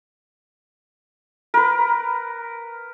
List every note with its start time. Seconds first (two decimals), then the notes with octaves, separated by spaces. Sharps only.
1.54 A#4 B4